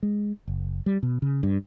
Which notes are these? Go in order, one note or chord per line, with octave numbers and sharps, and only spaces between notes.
G#3
F#1
G3
B2
C#3
G2